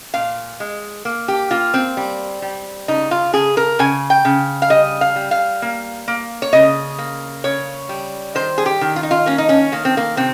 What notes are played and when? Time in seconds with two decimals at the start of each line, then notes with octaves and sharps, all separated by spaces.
0.14 A#2 F5
0.60 G#3
1.05 A#3
1.28 G4
1.51 A#3 F4
1.74 C4
1.97 G3
2.42 G3
2.88 C#3 D#4
3.11 F4
3.33 C#3 G#4
3.57 A#4
3.79 C#3 G#5
4.10 G5
4.25 C#3
4.62 F5
4.70 G3 D#5
5.01 F5
5.16 G3
5.31 F5
5.62 A#3
6.08 A#3
6.42 C#5
6.53 C#3 D#5
6.98 A#3
7.44 C#3 C#5
7.89 G3
8.35 D#3 C5
8.58 G#4
8.66 G4
8.81 D#3
8.96 F4
9.03 D#4
9.11 F4
9.26 A#3 C#4
9.38 D#4
9.49 C#4
9.72 D#3 A#3
9.85 C4
9.97 A#3
10.17 C3 C4